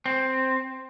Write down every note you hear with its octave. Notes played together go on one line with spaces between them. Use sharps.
C4